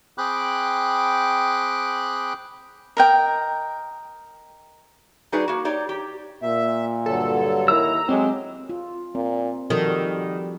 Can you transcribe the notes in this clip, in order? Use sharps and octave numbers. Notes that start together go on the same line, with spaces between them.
C4 G#4 G5 B5 D6 F#6
A#4 D#5 G5
G3 D#4 F#4 G#4 B4 D5
A#3 F#4
D#4 G4 C#5 D5
G4
A#2 E5
G2 D3 F#3 A4
D#2 E4 A#4 A#5 E6
F#3 G#3 C4 G4
F4
A#2 C4
D#3 F3 G3 F#4 A4